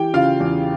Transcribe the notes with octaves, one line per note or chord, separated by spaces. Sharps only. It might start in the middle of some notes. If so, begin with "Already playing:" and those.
Already playing: E3 G4 G5
C#3 F4 F5
E2